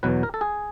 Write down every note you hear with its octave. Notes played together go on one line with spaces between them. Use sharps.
E2 B2 F#3 B4
A#4
A4
G#4